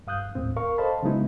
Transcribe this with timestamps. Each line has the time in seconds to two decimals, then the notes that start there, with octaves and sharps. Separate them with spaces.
0.07 G2 F5 D#6 F#6 G6
0.35 D#2 A2 C4
0.56 A#4 F5 C#6
0.78 A4 C5 D#5 F5 A5 B5
1.03 C#3 F#3 G#3 B3 D#4 E4